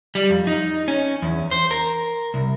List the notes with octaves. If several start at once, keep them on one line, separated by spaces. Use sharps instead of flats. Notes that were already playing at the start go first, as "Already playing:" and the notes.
G3
F2
D#4
C#4
E2
C5
A#4
C2